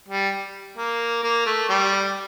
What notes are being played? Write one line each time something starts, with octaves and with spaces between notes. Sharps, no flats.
G3
A#3
A#3
A3
G3